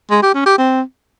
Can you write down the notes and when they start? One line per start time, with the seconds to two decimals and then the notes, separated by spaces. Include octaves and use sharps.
0.11 G#3
0.22 G4
0.34 C#4
0.46 G4
0.58 C4